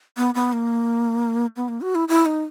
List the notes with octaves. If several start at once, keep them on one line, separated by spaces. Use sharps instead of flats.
B3
B3
A#3
B3
A#3
F#4
E4
E4
D#4